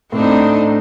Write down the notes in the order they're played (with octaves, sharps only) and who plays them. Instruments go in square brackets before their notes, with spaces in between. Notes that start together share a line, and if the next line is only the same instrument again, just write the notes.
[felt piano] A2 [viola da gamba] C4 D4 D#4